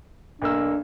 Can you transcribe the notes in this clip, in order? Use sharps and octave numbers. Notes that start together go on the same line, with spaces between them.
B1 A#3 D4 E6